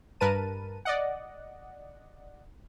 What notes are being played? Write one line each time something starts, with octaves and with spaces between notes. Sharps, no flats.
G2 A#4 B4 A5 D#7
D5 D#5 F#5